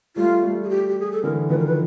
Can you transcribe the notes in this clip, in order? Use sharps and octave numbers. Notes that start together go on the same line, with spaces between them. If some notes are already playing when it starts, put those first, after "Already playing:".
G3 A3 F4
G3 A3
G#4
G4
G4
G#4
A4
D3 E3 A#4
D#3 F3 B4
A#4
B4